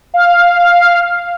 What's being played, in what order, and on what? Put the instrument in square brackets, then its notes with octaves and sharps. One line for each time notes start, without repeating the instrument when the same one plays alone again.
[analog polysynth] F5